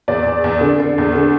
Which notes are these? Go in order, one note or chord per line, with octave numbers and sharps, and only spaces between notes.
E2 D5
E2
E2
D3
D3
E2
D3